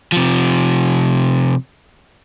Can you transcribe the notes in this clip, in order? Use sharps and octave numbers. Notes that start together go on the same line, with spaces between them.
C3 F3